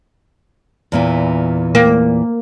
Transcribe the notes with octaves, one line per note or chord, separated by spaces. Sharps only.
E2 A#2 E3
A#3